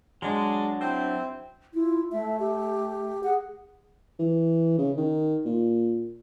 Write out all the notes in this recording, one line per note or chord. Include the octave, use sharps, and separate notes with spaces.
F#3 G#3 D4
C4 E4
E4 F4
A3 E5
G4
G#4 F#5
E3
C#3
D#3
A#2